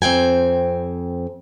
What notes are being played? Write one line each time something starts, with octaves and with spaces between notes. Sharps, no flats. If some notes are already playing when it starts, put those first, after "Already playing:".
F2 C4 G5 G#5